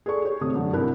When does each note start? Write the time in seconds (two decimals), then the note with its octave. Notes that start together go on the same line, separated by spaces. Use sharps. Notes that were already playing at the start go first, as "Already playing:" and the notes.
0.06 G#4 A4 D5 C#6
0.25 G4 C#5
0.41 G#1 C3 A3 D#6
0.55 F#2 D3
0.73 C2 E4 G4 A#4 F#6